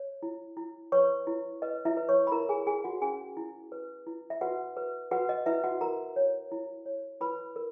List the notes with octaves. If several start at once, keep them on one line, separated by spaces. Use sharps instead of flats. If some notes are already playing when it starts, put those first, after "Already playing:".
Already playing: C#5
E4
E4
B4 C#5 C#6
E4
B4 D#5
E4 E5
B4
C#5 C#6
B5
E4 A#4 A#5
G#4 G#5
G#4 G#5
F#4 F#5
C#4 G#4 G#5
E4
B4
E4
E5
F#4 B4 F#5
B4
F#4 B4 F#5
D#5
E4 B4 E5
F#4 F#5
F#4 A#4 A#5
C#5
E4
C#5
E4 B4 B5
A#4